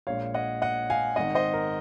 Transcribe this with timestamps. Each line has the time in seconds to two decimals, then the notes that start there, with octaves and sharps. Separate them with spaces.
0.07 A#1 A#2 G#3 C#5 F5
0.34 D#5 F#5
0.62 D#5 F#5
0.90 F5 G#5
1.16 G#1 G#2 D#3 D#5 F#5
1.35 C5 D#5
1.54 A#4